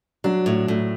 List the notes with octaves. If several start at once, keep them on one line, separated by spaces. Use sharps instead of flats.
F#3 D4
A2
A2